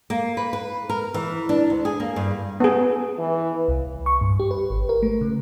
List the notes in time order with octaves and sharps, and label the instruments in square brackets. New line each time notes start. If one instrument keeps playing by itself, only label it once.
[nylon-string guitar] A#3
B4
B4
A#4
E3
D4
D2
G#4
A#3
G2
[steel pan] B3 G#4
[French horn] E3
[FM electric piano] C2
C#6
G2
G4
B4
G#1
A#4
A3
C#3